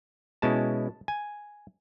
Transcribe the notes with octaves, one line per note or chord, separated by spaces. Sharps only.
B2 G#3 C#4 E4 A5
G#5